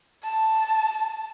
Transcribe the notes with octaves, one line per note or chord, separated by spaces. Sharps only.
A5